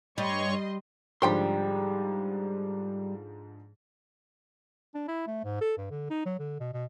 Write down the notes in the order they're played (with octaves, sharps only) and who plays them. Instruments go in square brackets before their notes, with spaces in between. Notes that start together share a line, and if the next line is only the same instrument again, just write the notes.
[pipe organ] G2 C#5 C#6 [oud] G3 [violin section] D#5 C6
[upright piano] G#2 D3 F3 [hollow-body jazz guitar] G3 G5 C6
[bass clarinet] D4
E4
A3
G#2
A4
G2
D3
D#4
F#3
D3
B2
B2